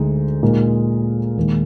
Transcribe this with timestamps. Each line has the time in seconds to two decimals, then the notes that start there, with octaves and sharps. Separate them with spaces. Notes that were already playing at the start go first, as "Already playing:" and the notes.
Already playing: D2 D3 G#3 D#4 G#4
0.42 A#2 G#3 D#4 A#4
1.37 D#2 D#3 G#3